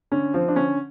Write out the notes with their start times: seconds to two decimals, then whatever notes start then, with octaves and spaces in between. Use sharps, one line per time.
0.12 D3 C#4
0.34 F3 C4
0.48 D4
0.56 D3 C#4